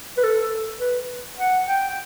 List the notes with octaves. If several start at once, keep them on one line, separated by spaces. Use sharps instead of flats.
B4
A4
B4
F#5
G5